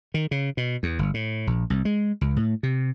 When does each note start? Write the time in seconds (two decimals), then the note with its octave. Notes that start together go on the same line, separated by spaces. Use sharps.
0.14 D#3
0.31 C#3
0.57 B2
0.83 E2
0.99 G1
1.14 A2
1.47 A#1
1.70 C2
1.85 G#3
2.21 C#2
2.36 A2
2.63 C3